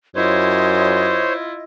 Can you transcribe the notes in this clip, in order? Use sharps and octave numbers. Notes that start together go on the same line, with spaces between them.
F#2 E4 F4 C5 C#5 D#5